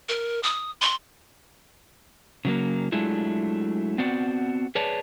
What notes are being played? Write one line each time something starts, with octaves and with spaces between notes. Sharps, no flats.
A#4
D#6
C6
C#3 F#3 A#3
F#3 G#3 A3 D4 E4 F4
B3 C4 F#4 D5
G#4 B4 C#5 D5 A5